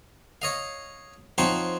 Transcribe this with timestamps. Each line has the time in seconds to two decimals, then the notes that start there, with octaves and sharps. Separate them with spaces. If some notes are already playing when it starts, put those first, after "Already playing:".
0.42 C#5 D#5 F5
1.38 F3 C4 D#4 C#5 F#5 C6